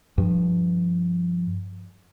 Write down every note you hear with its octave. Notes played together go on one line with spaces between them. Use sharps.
G2 F3